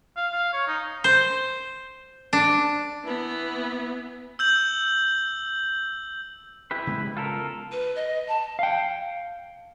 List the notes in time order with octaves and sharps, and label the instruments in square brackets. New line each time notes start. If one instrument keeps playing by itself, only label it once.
[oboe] F5
F5
C#5
D#4
[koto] C5
D4
[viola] E3 B3
[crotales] E6 G6 F#7
[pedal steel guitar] E4 G4 B4
[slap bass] C#3 G#3 B3
[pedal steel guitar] F4 A4 A#4
[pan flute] B4
D#5
A5
[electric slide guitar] F5 G5